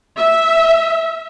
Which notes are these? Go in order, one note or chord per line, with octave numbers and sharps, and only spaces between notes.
E5